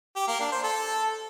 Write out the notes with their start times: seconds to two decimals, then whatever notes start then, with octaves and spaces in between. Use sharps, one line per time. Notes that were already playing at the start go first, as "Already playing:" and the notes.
0.16 G4
0.28 A#3
0.40 D4
0.52 C5
0.64 A4